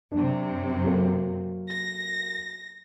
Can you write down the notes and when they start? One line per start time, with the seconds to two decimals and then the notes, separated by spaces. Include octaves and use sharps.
0.12 F#2 C3 D4
0.84 F#3 A#3 A4
1.68 A#6